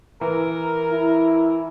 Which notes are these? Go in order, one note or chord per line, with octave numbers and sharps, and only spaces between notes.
E3 A#4
E4